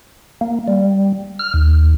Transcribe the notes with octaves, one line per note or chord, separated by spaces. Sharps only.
A#3
G3
F6
D#2